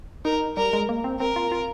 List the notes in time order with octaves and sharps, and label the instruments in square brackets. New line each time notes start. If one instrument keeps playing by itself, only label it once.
[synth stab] D#4 [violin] A#4
[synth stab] G3 [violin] A#4
[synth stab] G#3
A#3
C4
[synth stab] C4 [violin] A#4
[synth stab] F4
F4